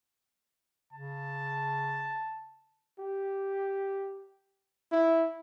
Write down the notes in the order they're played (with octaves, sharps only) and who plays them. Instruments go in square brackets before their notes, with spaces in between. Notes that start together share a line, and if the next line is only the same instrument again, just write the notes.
[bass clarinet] C#3 [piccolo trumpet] A5
[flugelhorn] G4
E4